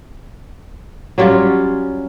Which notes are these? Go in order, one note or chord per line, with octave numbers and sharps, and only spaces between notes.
F#3 G3 C#4 F4